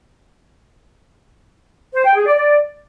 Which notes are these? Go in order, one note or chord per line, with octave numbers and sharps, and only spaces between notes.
C5
G5
G#4
D5
D5